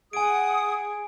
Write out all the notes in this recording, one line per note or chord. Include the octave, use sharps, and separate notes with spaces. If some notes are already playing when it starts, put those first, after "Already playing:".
G#4 F#5 G#5 D#6 D7